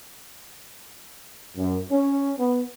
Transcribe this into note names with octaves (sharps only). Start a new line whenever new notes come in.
F#2
C#4
B3